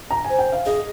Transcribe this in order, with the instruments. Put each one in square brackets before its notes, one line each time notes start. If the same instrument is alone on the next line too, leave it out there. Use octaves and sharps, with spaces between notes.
[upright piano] A#5
[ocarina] C5 [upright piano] G#5
[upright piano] G5
F5
[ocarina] G#4 [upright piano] D#5